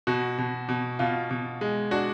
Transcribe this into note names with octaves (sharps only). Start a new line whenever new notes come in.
B2 F#4
B2
B2
B2 F4
B2
G#3
D4 F#4